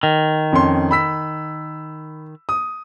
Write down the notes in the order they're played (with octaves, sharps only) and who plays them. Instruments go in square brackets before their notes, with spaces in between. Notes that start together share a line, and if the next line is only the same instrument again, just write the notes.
[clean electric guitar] D#3
[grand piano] F2 C#4 C6
B5 E6 B6
D#6